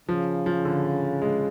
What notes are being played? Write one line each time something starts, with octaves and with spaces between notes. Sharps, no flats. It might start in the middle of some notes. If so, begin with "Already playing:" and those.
C#3 F3
F3
D3
G#3